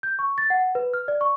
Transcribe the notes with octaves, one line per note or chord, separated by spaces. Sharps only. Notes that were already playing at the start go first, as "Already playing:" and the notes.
G6
C#6
A6
F#5
B4
F6
D5
C#6